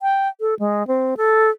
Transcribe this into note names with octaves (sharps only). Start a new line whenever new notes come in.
G5
A4
G#3
C4
A4